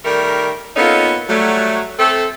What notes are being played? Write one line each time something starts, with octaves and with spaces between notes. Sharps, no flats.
D#3 G3 A3 A#4
A#3 B3 C#4 D#4 F4 A4
F#3 G3 A3
A3 C4 A4